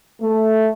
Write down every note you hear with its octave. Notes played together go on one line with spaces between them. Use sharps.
A3